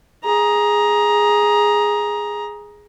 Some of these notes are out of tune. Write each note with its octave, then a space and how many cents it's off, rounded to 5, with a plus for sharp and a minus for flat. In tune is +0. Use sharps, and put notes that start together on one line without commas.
G#4 +0 A#5 +15